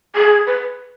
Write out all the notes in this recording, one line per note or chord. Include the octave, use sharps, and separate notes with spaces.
G#4
B4